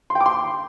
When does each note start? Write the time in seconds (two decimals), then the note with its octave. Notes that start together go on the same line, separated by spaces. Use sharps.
0.10 C6
0.15 G5
0.20 D6
0.26 C6